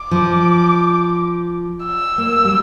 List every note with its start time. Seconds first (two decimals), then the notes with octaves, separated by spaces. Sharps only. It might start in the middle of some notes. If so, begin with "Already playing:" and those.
Already playing: D6
0.11 F3
1.84 E6
2.18 A#3
2.45 G3